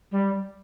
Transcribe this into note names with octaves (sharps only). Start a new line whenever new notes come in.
G3